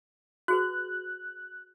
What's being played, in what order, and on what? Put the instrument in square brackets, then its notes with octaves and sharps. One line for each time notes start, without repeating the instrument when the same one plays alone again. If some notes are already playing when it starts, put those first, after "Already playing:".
[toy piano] F#4 G#4 B4 [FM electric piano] F#6